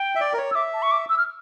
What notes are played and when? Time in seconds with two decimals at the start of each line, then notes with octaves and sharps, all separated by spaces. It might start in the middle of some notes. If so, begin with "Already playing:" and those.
Already playing: G5
0.15 E5
0.21 D5
0.33 A#4
0.38 C#5
0.51 E6
0.55 E5 D6
0.73 A5
0.82 C#6
0.91 D6
1.09 E6
1.18 F6